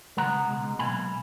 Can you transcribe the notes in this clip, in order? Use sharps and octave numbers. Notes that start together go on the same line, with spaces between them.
C#3 G#3 B3 F#5 A#5
C#2 B2 G#3
B1 B2 A#3 G#5 B5